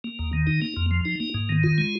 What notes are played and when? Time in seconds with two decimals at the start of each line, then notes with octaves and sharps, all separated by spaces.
0.04 A#3
0.19 D#2
0.33 D#3
0.47 D#4
0.62 A#3
0.77 F2
0.91 F3
1.05 D#4
1.20 A#3
1.35 G#2
1.49 D#3
1.63 F4
1.78 G#3